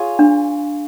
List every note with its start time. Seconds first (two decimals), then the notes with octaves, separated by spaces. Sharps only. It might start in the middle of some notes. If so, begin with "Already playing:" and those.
Already playing: F4 G#4 C#5
0.19 D4